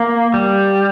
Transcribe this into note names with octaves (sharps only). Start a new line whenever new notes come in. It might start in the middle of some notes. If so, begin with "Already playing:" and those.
Already playing: A#3
G3